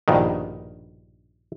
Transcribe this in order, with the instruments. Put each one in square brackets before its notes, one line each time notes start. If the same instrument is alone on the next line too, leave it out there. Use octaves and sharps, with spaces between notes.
[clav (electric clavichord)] A#1 G2 B2 D#3